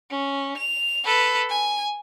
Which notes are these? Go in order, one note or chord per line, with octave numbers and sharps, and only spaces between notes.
C#4
F7
A4 B4
G#5